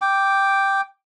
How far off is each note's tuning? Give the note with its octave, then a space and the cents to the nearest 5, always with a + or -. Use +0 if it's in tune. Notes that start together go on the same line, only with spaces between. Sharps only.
G5 +0 D6 +0